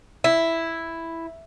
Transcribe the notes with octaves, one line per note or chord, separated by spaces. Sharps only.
E4